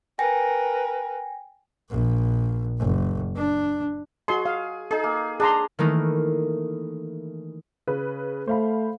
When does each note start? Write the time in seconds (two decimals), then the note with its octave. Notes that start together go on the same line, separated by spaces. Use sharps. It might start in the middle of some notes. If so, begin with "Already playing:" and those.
0.19 A#4 B4 G5 G#5 A#6
1.90 A#1
2.79 F#1
3.36 D4
4.28 F#4 G#4 D#5 C6
4.45 F5
4.91 D#4 G#4 A4
5.04 A#3
5.40 D4 G#4 A#5 C6
5.79 D#3 E3 A3 A#3 D#4 E4
7.87 C#3 B4
8.48 A3 C5 F5 B5